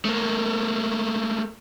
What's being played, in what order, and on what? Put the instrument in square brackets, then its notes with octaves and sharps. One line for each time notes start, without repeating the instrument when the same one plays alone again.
[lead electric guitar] A3 A#3